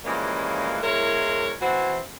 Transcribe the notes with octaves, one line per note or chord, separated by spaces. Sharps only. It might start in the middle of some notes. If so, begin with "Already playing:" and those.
G2 E3 F3 G#3 A#3 C#4
E2 G#3 A#3 E4 A#4 C#5
E3 C4 F#4